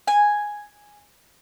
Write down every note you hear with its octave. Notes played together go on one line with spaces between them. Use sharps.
G#5